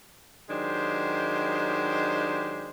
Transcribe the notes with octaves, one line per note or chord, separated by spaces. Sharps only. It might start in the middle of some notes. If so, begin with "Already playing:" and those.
D#3 F#3 G#3 D4 G4 C5